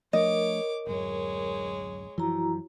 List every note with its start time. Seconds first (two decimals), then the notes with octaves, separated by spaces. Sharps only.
0.13 F3 A3 D4 A#4 C#5 D#5 D6
0.87 D1 F#2 G#3 C#5
2.18 F#2 E3 F3 E4 F#4 A#5